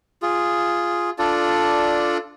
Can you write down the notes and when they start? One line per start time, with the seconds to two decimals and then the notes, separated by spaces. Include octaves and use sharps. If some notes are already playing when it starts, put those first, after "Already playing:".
0.22 F4 G#4
1.19 D4 F4 A4 D5